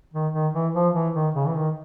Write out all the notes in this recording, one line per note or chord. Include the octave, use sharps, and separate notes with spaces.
D#3
D#3
E3
F3
E3
D#3
C#3
E3
D#3